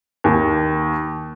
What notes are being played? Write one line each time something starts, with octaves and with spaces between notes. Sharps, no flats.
D#2